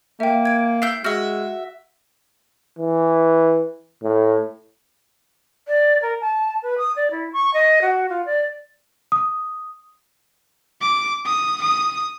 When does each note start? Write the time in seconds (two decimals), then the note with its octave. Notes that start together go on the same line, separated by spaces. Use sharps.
0.20 A#3 E5 G5
0.45 G#6 D7
0.82 E4 G6 C7
1.04 G#3 F#4 E5 F6
2.79 E3
4.03 A2
5.68 D5
6.02 A#4
6.21 A5
6.63 B4
6.78 D#6
6.96 D5
7.11 E4
7.33 C#6
7.54 D#5
7.82 F#4
8.09 F4
8.26 D5
9.12 D#6
10.81 D6
11.26 D#6
11.62 D#6